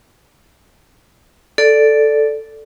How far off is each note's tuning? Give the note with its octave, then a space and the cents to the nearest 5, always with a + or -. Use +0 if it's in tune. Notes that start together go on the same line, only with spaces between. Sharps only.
A4 +0 D5 +0